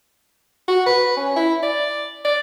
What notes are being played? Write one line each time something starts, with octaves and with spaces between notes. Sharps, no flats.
F#4
B4
C#4
E4
D5
D5